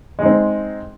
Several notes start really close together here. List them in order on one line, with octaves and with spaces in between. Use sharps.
G#3 D#4 C4